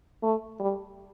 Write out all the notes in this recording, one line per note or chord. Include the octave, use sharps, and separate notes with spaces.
A3
G3